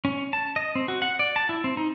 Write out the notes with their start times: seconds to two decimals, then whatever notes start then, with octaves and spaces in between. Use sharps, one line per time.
0.05 C#4
0.33 A5
0.56 D#5
0.75 C4
0.88 F#4
1.02 F#5
1.19 D5
1.36 A5
1.49 E4
1.64 C4
1.77 D#4